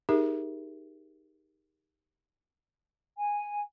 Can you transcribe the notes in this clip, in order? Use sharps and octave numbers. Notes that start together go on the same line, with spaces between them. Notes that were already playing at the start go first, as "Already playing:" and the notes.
D#4 G4 G#4 A#4 E5
G#5